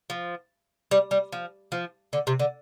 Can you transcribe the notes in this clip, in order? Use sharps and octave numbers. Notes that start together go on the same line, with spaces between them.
F3
G3
G3
F3
F3
D3
C3
D3